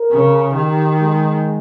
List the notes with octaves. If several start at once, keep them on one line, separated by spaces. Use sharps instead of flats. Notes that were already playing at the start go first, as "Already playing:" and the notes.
Already playing: A#4
C#3
D#3 G4
G#3